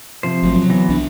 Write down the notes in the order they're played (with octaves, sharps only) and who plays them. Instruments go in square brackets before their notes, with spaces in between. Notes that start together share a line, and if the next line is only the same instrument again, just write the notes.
[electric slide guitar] C3 F3 C5
[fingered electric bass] G#1 A2 F#3
F#3
[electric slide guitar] E3 B3 F#4
[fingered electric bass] C2 D4